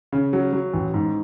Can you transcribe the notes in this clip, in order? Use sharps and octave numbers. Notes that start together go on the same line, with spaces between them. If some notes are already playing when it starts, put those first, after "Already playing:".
C#3
F#3
F#3
A1
G#2